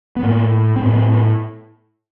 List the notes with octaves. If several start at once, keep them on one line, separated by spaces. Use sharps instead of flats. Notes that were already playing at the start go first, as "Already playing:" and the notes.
B3
A2 A#3
C4
A2 B3
B3
C4
B3